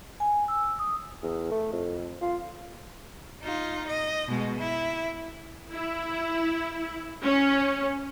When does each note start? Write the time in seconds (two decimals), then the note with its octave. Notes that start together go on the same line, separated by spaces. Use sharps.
0.20 G#5
0.48 E6
0.79 D#6
1.23 E2
1.51 A3
1.72 F2
2.21 F4
3.43 D#4 F4
3.88 D#5
4.28 B2 G#3
4.59 E4
5.71 E4
7.24 C#4